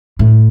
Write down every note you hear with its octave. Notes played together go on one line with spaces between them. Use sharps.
A2